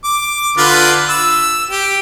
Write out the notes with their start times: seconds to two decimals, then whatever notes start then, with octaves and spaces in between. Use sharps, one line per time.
0.04 D6
0.58 D3 F4 B4
1.09 E6
1.70 G4